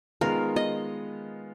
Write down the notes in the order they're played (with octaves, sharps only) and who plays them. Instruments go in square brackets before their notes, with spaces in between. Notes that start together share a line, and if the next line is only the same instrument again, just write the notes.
[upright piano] D#3 G#3 B3 F4 [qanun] A#4
[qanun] D#5